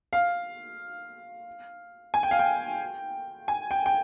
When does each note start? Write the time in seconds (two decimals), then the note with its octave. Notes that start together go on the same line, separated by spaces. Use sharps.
0.13 F5
2.14 G#5
2.23 G5
2.31 F5
2.39 G5
3.48 G#5
3.71 G5
3.86 G5